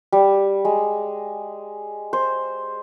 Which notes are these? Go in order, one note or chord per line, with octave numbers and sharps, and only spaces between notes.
G3
G#3
C5